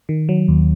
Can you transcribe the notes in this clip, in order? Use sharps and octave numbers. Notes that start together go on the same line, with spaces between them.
D#3
F#3
D#2